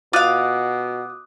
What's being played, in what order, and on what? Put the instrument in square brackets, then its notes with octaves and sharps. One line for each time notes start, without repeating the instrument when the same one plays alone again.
[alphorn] B2 [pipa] F4 F5 [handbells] D6 D#6 F#6